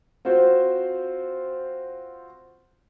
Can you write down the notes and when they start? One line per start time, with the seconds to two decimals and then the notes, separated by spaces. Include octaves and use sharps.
0.25 C4 F4 F#4 C5